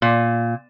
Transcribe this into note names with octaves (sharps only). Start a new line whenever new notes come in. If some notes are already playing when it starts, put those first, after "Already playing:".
A#2